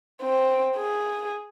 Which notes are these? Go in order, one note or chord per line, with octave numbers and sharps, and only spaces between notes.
C4
G#4